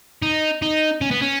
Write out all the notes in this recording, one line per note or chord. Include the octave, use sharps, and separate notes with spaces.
D#4
D#4
C#4
B3
C#4